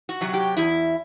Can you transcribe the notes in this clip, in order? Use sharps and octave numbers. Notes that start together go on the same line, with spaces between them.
F#4
C3 F#3
G4
E2 E4